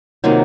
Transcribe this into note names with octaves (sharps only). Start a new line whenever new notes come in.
C3 D#3 F#3 A#3 F4